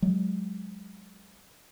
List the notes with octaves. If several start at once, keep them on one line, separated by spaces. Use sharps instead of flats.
F#3 G#3